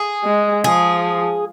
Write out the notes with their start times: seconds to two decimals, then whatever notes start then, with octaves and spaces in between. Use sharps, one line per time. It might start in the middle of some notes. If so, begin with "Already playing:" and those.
Already playing: G#4
0.25 G#3
0.64 F3 G#4